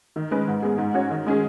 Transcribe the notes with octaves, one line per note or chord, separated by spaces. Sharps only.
D#3
G#3 C#4 B4
G#2
G#3 B3 G#4
G#2
G#3 C#4 F#4 C#5
D#3
G#3 C#4 G#4